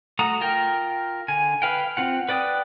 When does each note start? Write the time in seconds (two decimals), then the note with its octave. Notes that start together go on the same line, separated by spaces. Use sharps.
0.19 A3 F#4 A#5 D#6
0.41 F4 A#4 G5
1.28 D3 G#5
1.62 B4 F5 G5
1.97 C4 F4 F#5
2.29 B4 D5 G5 D#6 F#6